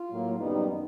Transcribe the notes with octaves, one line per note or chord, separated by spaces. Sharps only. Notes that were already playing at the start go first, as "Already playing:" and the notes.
Already playing: F4
A2 F#3 A#3
F#2 D#3 G3 B3 D#4